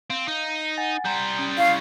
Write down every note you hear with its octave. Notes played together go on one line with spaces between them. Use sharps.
C4 F5
D#4
F#5 G#5 A6
G3 C5 A#5 G6
C#4 D#6 G6
E4 F5 C#6 G#6